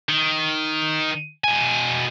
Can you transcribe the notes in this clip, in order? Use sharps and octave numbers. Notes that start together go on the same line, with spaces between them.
D#3
B2 G#5